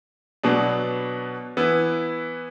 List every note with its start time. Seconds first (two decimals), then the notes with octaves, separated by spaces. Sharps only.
0.43 B2 F#3 B3 D4
1.57 E3 B3 E4